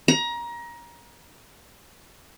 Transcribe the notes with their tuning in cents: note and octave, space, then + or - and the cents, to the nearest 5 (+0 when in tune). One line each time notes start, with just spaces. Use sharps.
A#5 +25